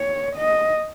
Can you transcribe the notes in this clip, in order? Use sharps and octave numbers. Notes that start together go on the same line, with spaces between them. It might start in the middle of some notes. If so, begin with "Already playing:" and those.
Already playing: C#5
D#5